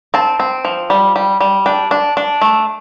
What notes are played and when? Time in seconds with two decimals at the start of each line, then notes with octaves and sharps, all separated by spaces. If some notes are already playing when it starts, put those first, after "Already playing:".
0.14 C4 A5
0.40 C4
0.65 F3
0.90 G3
1.16 G3
1.41 G3
1.66 D4 G5
1.91 D4
2.17 D4
2.41 A3